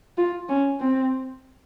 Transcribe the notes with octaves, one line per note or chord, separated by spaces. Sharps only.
F4
C#4
C4